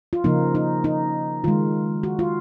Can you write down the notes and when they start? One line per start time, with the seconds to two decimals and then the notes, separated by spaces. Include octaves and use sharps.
0.13 F4
0.24 C#3 F3 A#3 D#4
0.55 D#4
0.84 D#4
1.44 D#3 G#3 F4
2.03 F#4
2.19 F4